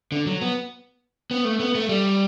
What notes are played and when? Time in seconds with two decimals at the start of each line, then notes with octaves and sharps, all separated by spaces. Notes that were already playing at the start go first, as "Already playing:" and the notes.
0.12 D3
0.27 F#3
0.41 B3
1.31 B3
1.45 A3
1.60 B3
1.75 A3
1.89 G3